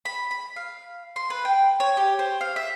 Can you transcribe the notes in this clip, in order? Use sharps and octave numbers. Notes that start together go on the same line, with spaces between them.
B5
B5
F5
C6
B4
G5
C#5
G4
C5
F5
E5